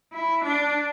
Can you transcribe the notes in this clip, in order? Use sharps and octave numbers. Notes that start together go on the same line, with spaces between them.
E4
D4